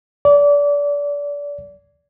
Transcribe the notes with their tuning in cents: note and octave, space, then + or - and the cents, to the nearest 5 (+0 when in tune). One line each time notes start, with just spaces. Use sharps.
D5 -30